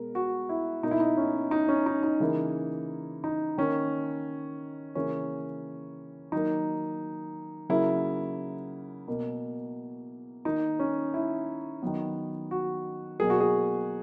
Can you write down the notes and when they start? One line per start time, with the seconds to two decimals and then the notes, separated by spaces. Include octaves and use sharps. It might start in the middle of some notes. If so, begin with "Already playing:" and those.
Already playing: B2 G#3 B3 A#4
0.15 F#4
0.49 E4
0.83 B2 A#3 D#4
0.91 E4
1.00 D#4
1.17 C#4
1.51 D#4
1.68 C#4
1.86 D#4
2.03 D#4
2.20 C#3 E3 A#3
3.24 D#4
3.58 D#3 A#3 C#4
4.95 C#3 E3 A#3 C#4
6.32 D#3 F#3 A#3 D#4
7.69 C#3 F#3 A#3 E4
9.08 B2 A#3
10.45 D#3 A#3 D#4
10.79 C#4
11.14 E4
11.82 D#3 F#3 B3
12.51 F#4
13.20 B2 F#3 A#3 G#4
13.30 F#4
13.40 G#4